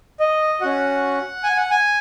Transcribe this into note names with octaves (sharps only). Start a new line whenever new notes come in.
D#5
C#4 F#4 F#5
G#5
F#5
G#5